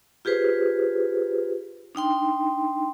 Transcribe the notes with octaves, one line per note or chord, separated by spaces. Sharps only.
F4 G4 G#4 B4 C5
D4 D#4 G5 C6